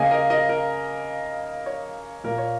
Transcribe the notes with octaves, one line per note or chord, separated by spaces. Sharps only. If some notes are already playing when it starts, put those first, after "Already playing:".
Already playing: C#3 A#3 D#5 G#5
A#4 D#5
A#4 D#5
A#4
C#5
A#2 A#3 A#4
C#5